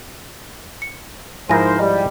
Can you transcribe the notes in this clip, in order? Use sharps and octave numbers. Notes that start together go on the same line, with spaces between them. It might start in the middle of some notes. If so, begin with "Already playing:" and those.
C#7
G#2 F3 D#4 E4 A#4 C5 G#5 A#6
G3 D#5